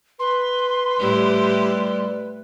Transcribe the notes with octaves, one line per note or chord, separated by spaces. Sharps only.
B4 C6
A2 G3 E4 G4